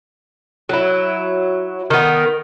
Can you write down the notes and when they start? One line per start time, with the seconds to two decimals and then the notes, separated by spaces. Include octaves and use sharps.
0.69 F#3 E4
1.90 D#3 B3